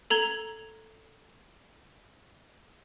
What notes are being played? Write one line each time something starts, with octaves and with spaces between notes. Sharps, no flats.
A4 A#5 G#6 G7